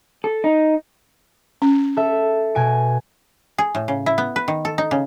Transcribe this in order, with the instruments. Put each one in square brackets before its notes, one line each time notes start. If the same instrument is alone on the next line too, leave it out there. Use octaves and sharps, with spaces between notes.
[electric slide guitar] A4
D#4
[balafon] C#4
[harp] A4 E5
B2 G#5 D7
[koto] G#4
A2
C#3
E4
B3
B4
D#3
A4
D#4
C#3